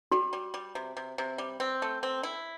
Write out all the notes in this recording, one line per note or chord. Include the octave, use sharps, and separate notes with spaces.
G3 F#4
G3
G3
C3
C3
C3
G3
C4
A3
C4
E4